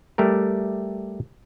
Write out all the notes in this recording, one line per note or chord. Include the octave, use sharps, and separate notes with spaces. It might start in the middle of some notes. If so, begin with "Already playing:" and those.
G3 A3 G4 A#4